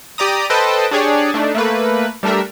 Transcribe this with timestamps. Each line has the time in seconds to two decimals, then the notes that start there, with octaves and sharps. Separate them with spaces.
0.18 G4 D5 A#5 D#6
0.50 A4 B4 C5 D#5 G5 A5
0.91 D4 G4 G#4 C#5 D5
1.34 A3 D4 D#4
1.55 A3 A#3 B4
2.23 G3 A3 D4 A#4 E5